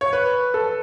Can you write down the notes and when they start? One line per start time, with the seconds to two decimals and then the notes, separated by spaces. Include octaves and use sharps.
0.01 C#5
0.13 B4
0.54 A4